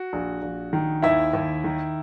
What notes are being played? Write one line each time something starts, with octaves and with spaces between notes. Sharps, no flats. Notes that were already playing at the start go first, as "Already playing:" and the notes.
Already playing: F#4
A#1
A#1
D#3
D#2 E4 E5
D#2
D#3